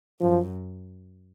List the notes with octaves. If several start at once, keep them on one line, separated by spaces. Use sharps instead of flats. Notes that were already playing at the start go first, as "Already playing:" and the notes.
F#2 F3